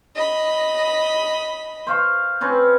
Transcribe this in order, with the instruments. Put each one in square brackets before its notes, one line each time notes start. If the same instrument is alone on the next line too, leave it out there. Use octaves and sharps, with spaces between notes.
[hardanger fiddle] D#5 B5
[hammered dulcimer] C5 F5 C#6
C4 C#4 B4